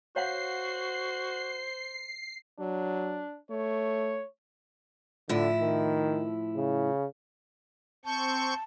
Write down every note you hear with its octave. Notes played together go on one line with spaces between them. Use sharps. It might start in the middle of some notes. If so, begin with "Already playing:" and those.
F#4 C5 C#5 F5 F#5 C7
F#3 D4
A3 C#5
A2 D3 F3 E4
D#3
C#3
C4 A5 C#6 G6